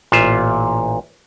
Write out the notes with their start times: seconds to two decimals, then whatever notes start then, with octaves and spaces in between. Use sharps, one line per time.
0.12 A1 A#2 F4 E5